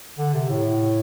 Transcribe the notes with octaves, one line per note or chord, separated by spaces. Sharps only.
D3
C3
A2